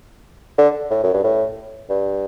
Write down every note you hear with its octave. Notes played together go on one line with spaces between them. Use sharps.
D3
A2
F#2
G2
A2
G2